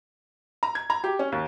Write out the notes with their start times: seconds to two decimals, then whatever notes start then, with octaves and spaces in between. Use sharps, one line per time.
0.63 A#5
0.75 G#6
0.90 A#5
1.04 G4
1.19 C#4
1.32 D#2